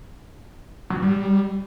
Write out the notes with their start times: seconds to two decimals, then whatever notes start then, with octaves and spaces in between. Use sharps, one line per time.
0.90 F#3
0.96 G2
1.02 G3